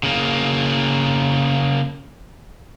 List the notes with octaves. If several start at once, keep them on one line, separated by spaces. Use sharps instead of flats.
C#3 A#3